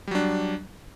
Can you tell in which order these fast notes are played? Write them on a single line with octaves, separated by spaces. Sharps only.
G3 F#3 D4